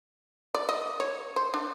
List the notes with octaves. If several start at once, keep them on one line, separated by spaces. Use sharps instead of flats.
D5
D#5
C#5
C5
D4